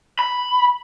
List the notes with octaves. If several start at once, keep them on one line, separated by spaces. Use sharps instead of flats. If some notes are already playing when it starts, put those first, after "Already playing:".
B5